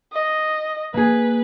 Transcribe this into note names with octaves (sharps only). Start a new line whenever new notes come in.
D#5
A#3 G#4 B4